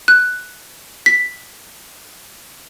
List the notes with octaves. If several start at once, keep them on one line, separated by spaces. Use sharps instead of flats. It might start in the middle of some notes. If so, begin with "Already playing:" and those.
F#6
B6